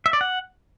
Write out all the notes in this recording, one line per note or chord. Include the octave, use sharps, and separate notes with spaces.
E5
D5
F#5